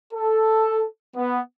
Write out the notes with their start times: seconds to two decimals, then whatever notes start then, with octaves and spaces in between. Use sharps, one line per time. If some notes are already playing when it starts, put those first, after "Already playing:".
0.13 A4
1.15 B3